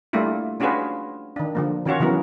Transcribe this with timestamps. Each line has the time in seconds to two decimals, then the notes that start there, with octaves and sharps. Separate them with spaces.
0.13 G3 A3 A#3 D4 E4 F4
0.60 C#4 D4 F4 F#4 G#4 B4
1.36 D#3 D4
1.55 D3 F3 A#3
1.85 D#3 C#4 F4 F#4 C#5
2.00 C#3 E3 F#3 B3 A#4